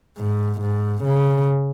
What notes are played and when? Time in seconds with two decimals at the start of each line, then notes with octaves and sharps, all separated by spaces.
0.18 G#2
0.61 G#2
1.04 C#3